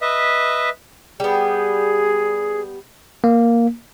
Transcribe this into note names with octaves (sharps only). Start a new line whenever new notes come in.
B4 D#5 E5
G3 B3 G#4
A#3